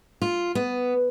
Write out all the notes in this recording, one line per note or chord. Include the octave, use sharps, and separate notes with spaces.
F4
B3